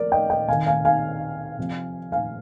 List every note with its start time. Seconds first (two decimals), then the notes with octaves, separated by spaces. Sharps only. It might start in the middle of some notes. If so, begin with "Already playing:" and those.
Already playing: F3 A#4 D5
0.12 D#5 G5
0.30 D#5 G5
0.48 C3 D#3 F5 G#5
0.66 F5 G#5
0.85 F5 G#5
1.58 C3 F3
2.12 F5 G#5